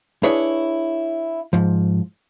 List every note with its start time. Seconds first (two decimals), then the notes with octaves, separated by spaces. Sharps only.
0.23 D4 E4 G#4 B4 C#5
1.53 G#2 F3